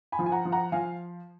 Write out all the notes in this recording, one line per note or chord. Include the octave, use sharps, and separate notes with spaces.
G#5 B5
F3
G#5
F#5 A#5
F3
F#5 A#5
F3 F5 G#5